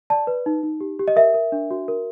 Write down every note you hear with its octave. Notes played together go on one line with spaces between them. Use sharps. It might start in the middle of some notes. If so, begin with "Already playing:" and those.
D5 A5
B4
D#4
D#4
G4
G4
D#5
A#4 E5
A#4
D4
F#4
A#4